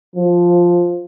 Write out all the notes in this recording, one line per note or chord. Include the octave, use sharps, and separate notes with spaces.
F3